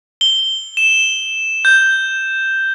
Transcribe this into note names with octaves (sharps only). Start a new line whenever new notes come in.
G7
E7
G6